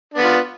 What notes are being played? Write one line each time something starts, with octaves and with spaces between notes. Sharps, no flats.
B3 D4 F4